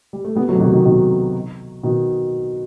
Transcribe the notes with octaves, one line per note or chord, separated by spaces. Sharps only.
G3
A3
G3 B3
F#3 A3
C3
B2 D#3
B2 D#3
B2 D#3
B2 D#3